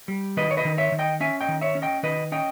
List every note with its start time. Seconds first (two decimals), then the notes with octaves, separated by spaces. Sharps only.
0.08 G3
0.37 D#3 B4 D#5
0.51 C#5
0.57 B4 D#5
0.65 D#3
0.78 C#5 E5
0.92 D#3
0.99 D#5 G5
1.20 C#4 E5 G#5
1.41 D#5 G5
1.48 D#3
1.61 C#5 E5
1.75 C#4
1.82 D#5 G5
2.03 D#3 B4 D#5
2.32 C#4 D#5 G5